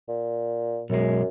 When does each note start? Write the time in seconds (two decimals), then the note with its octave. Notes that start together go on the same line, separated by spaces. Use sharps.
0.08 A#2
0.90 B1 F#2 G#3